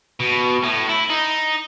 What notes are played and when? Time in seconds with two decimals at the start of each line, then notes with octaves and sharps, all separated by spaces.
0.20 B2
0.63 A2
0.89 E4
1.10 D#4